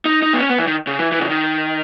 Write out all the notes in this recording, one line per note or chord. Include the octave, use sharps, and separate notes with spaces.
D#4
D#4
B3
C#4
B3
E3
D#3
C#3
E3
E3
C#3
D#3